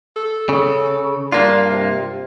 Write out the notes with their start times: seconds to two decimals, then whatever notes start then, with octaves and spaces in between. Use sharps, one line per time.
0.17 A4
0.49 C#3
1.32 G2 A#3 D4 F4
1.71 C3